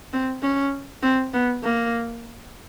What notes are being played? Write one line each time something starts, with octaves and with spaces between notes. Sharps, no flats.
C4
C#4
C4
B3
A#3